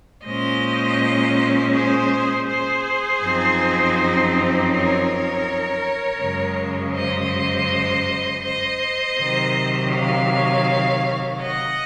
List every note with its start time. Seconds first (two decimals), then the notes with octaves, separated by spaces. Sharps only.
0.24 A#2 G#3 C#4 C5 D#5
1.73 G#4 C5
2.48 G#4 C5
3.23 F#2 F3 C4 D#4
4.71 A#4 C#5
6.20 F#2 C#3 G#3
6.95 C5 D#5
8.43 C5 D#5
9.18 C3 D#3 F#3
9.92 C#5 F5
11.42 D#5 F#5